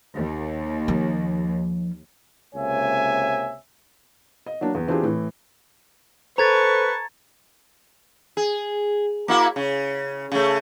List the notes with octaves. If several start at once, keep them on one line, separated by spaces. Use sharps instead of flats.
D#2
F3
C#2 C3 A#3 C#5 E5 G#5
D#5
F#3 A#3 D4
E2
E3 C4 D4 F4 G4 G#4
A2 E3
A4 B4 C5 A5 A#5 C#6 G#6 A6
G#4
A#3 E4 F#4
C#3
C#3 A3